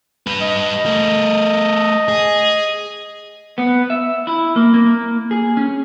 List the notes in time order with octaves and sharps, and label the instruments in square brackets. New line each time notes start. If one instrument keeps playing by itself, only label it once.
[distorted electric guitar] G3 B4
[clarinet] D#5
[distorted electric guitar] A3 A#4
G#4
[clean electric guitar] B3
E5
E4
A#3
A#3
G#4
C#4